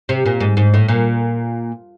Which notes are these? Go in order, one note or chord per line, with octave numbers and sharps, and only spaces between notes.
C3
A#2
G#2
G#2
A2
A#2